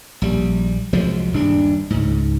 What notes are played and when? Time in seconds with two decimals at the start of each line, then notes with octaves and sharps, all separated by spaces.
0.22 A#1 G3
0.93 C2 F3 F#3 G#3
1.33 D#1 G2 D4
1.90 C#2 G#2